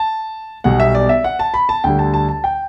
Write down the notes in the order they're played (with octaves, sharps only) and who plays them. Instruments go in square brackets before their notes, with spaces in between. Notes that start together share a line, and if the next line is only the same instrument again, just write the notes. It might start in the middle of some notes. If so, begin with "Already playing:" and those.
Already playing: [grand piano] A5
B1 B2 G3 F#5
E5
D5
E5
F#5
A5
B5
A5
D2 D3 G3 G5
A5
A5
A5
G5